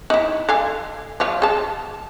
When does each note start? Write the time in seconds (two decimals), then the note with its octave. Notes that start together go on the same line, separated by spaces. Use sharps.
0.10 D#4 E4
0.49 A4 F5 G#5
1.20 F3 F#3 F5
1.42 G#4 A5